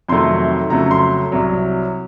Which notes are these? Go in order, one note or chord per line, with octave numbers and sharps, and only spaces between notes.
F2 C3 D#3 F#3 A3 C6
F2 C#3 F#3 A3 A#5
A#5
C6
C2 C3 F#3